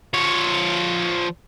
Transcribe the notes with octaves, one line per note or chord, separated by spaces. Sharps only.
F3 C#5